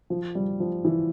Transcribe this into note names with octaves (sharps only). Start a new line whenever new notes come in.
F3
G3
F3
E3